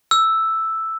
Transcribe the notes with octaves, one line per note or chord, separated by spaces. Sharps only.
E6